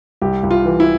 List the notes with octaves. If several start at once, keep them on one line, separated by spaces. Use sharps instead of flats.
C2 G4
C2
F4
E3
E4